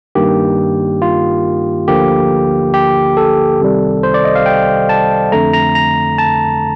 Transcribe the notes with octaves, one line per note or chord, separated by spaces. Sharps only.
G2 D#3 A#3 G4
F4
D2 D3 F3 A#3 G4
G4
A4
C2 C3 D#3 G3
C5
D5
D#5
F5
G5
A5
F2 D3 A3 A#5
A#5
A#5
A5